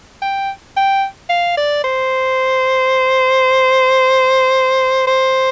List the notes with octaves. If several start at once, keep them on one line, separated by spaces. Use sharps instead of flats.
G5
G5
F5
D5
C5
C5